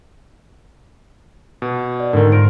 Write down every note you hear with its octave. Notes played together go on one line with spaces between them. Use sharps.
B2
D5
G#2 D3 D#3 D4 A#4
F4 A#4 C5 D7